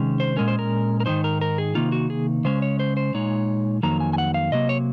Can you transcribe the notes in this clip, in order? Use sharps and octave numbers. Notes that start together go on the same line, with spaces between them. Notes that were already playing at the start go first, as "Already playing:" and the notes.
Already playing: C3 D#3 G#3 C#4
C5
A#2 G#3 C#4 A#4
C5
A#4
A#4
G#2 D#3 G#3 D#4 C5
A#4
A#4
G#4
C3 D#3 A#3 D#4 F4
F#4
G#4
C#3 G#3 C#4 C5
C#5
C5
C5
A#2 G#3 D#4 C#5
F2 D#3 F#3 A#3 D#4 A#5
G#5
G#5
F#5
F5
C3 F#3 A#3 D#5
C#5